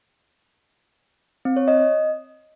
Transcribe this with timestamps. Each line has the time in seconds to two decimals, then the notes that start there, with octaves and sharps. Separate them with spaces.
1.45 C4
1.56 C#5
1.68 D#5